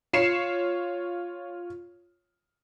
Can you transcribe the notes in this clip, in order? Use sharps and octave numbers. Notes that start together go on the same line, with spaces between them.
F4 C#5 C7 C#7 E7